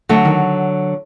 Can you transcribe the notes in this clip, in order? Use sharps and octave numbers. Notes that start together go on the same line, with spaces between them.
D3 F#3 A3
D#3